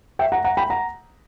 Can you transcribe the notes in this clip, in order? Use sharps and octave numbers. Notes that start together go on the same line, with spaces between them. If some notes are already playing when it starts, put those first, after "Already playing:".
E5 G5
F#5 A#5
F#5 A#5
G5 B5
F#5 A#5